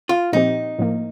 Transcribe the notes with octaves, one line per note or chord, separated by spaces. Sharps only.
F4
A#2 F3 C4 D#4 G4
A2 F3 A#3